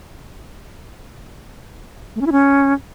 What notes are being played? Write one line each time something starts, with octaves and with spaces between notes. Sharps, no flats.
A3
C#4
E4
C#4